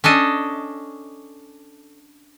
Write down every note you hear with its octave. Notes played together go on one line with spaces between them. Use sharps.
C#4 D4 A4 D#5